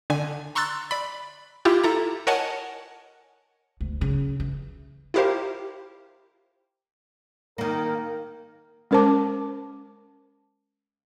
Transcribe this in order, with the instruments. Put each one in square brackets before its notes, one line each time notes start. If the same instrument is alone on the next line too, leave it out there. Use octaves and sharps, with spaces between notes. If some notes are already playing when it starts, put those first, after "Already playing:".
[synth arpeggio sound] D3 G#5
A#5 C6 C#6 E6 F#6 A6
D5 B5
E4 F4 G4
E4 A4 A#5
A#4 C#5 D#5 F#5 G#5 A5
[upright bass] D2
C#3
E3
[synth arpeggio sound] E4 F4 G4 A#4 C5 F5
[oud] D#3 A#3 [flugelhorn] A#4
[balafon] G#3 C#4 A#4 C5 A5 D6